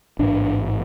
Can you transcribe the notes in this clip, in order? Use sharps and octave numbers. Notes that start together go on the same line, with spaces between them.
A1 G#2 D4